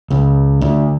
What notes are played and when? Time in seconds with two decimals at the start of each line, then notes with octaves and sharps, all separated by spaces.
0.10 C#2
0.61 D2